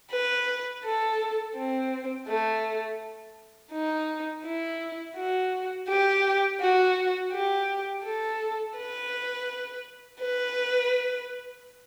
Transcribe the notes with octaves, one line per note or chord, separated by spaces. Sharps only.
B4
A4
C4
A3
D#4
E4
F#4
G4
F#4
G4
A4
B4
B4